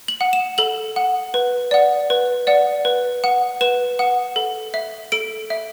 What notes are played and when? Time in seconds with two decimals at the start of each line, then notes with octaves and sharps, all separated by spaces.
0.08 F#7
0.21 F#5
0.33 E7
0.58 A4 F#7
0.96 F#5
1.34 B4
1.71 D5 F#5
2.10 B4
2.47 D5 F#5
2.85 B4
3.24 F#5
3.61 B4 E7
3.99 F#5
4.36 A4
4.74 E5
5.12 A4 D7
5.50 E5